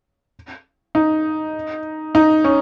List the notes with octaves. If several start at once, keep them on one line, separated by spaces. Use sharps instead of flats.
D#4
D#4
C#4